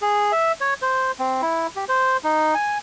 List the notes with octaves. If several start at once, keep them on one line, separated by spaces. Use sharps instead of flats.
G#4
E5
C#5
C5
C4
E4
G4
C5
D#4
G#5